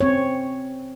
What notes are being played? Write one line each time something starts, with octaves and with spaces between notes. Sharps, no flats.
C4 C#5